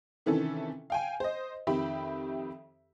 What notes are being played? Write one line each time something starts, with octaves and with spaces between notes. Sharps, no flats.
C3 D#3 E3 C#4 E4 A4
F5 G5 G#5
C5 D#5
F2 D#3 G4 E5 B5